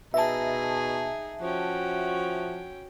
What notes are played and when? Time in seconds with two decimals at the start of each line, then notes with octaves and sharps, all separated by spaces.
0.14 B2 D#4 G#4 E5 A5
1.41 F3 C#4 F#4 G5